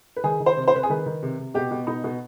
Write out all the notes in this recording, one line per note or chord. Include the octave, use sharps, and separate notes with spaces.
B4
D#3 G#4
D#3
C5
C3
C5
C3 B4
G#4
D#3 B4
D#3
C3
C3
B2 G4
B2
B2 D#4
B2